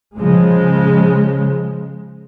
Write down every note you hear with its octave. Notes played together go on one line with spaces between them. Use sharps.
C#3 F3 G#3